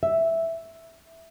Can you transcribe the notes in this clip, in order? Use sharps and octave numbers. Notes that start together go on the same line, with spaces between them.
E5